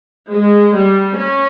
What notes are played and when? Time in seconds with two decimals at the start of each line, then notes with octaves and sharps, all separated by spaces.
0.31 G#3
0.75 G3
1.17 C#4